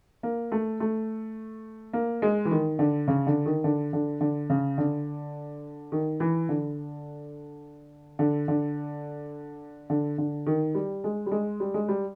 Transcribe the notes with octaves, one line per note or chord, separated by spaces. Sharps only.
A#3
A3
A3
A#3
G#3
E3
D#3
D3
C#3
D3
D#3
D3
D3
D3
C#3
D3
D#3
E3
D3
D3
D3
D3
D3
D#3
G3
G#3
G3
G#3
G3
G#3
G3